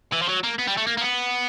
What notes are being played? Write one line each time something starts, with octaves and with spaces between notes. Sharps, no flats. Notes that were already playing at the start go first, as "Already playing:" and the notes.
E3
F3
F#3
A#3
B3
G3
A3
A#3
A#3
B3